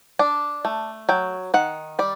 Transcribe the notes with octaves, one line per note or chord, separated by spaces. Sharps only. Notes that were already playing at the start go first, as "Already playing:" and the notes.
D4 D5
A3
F#3 G5
D#3 F#5
G3 D5